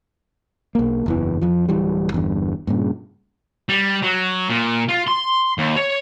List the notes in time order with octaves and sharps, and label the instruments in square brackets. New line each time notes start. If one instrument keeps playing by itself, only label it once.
[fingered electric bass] B1 A#3
F#1 E2 E3
F2 F3
D1 E3 G3
G1 E2 G2
G2 A#2 C#3
[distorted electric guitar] G3
F#3
A#2
F4
C6
D#2
C#5